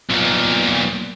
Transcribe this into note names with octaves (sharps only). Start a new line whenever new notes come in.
B1 A#2